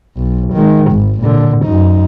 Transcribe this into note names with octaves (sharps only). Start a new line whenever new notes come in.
B1
D#3 G#3
G#1
A#2 D3
F#2 D#4